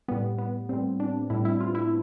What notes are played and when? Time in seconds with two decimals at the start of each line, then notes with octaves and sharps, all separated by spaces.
0.08 A2 G3 B3
0.38 B3
0.69 A2 G3 C4
1.00 D4
1.30 A2 G3 E4
1.45 E4
1.60 F4
1.75 E4